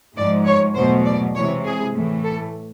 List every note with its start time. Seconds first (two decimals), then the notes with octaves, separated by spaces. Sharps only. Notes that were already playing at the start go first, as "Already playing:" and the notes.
0.16 G#2 F3 G#3 D5
0.46 C#5
0.75 E2 B2 F#3 A3 C5
1.05 D5
1.35 C3 E3 G#3 C#5
1.65 G#4
1.94 A2 E3 A3
2.24 A4